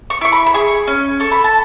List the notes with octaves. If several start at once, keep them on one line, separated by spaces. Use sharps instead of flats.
C#6
E4 C#6
B5
B5
G#4 C#6
C#4
A4 C#6
B5
A5